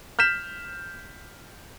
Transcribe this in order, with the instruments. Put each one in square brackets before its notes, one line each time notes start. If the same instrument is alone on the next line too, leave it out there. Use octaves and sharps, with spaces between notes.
[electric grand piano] F6 G6 B6 E7